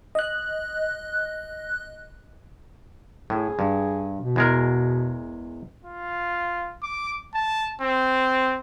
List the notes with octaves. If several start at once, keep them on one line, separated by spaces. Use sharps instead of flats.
D#5 F#6
A2 G#4
G2
B2
E2 G#3 A#4
F4
D6
A5
C4